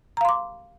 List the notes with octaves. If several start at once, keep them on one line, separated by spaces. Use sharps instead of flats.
F5 A#5 C6 D6